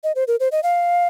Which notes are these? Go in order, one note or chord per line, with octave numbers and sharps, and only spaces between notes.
D#5
C5
A#4
C5
D#5
F5